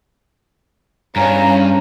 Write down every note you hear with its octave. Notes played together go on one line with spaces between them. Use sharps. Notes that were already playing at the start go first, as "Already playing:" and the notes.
E2 G2 C#4 F5 A#5